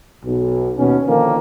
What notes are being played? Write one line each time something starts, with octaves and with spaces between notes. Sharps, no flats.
B1
D#2 B2 C#4
D3 D#3 F3 A#3